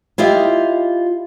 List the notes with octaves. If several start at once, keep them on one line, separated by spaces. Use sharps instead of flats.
E4 F4 G4 D#5